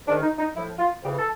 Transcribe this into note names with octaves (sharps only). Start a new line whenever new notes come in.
G#2 D#3 D4
D#4
D#4
A2 F3 E4
F4
F2 C#3 E3 G4
A4